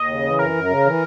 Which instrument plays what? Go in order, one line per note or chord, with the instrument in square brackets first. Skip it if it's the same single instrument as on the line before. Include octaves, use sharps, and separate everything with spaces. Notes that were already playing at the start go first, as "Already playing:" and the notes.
Already playing: [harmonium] D#2 [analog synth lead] D#5
[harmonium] C#3
E3
[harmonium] F#2 [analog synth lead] A#4
[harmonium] F#2
C#3
E3